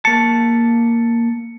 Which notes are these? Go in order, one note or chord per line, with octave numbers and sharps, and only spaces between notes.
A#3 A5 C#7